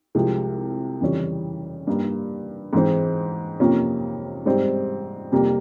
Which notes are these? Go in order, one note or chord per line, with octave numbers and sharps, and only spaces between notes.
C2 C3 F3 G#3
F2 C#3 E3 G3 C#4
G2 G3 A#3
G#2 E3 G#3 C4
F2 C3 F3 A#3 C#4
G#2 G3 C4
F2 C3 G3 A#3